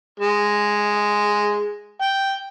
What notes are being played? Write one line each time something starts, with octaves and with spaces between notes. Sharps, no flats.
G#3
G5